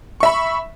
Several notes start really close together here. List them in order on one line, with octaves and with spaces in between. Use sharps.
C#6 E5 B5